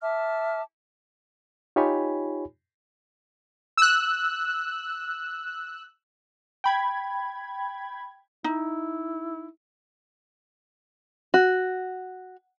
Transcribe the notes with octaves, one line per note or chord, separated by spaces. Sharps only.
E5 A5 D6 F6
D#4 F4 G4 C#5 G#5 B5
E6 F#6
G5 B5 G#6
D#4 E4
F#4